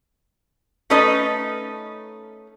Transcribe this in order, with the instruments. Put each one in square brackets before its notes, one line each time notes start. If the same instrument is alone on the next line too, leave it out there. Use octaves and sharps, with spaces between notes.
[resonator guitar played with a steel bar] A3 C#4 D#4 A4 B4 D#5